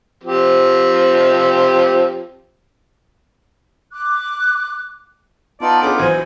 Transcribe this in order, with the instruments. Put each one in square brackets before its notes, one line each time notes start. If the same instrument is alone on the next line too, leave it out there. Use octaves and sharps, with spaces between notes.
[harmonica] F3 C4 G4
[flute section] D6 F#6
[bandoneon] B3 D#4 F4 [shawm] D5 [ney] A5
[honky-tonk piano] C#4 D4 G#4 [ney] A4 [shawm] D6
[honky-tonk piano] A#1 E3 F#3 [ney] C5 [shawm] G#5